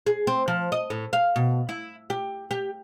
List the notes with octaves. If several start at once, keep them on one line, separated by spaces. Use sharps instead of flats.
G#4
C4
F3
D#5
A2
F5
B2
E4
G4
G4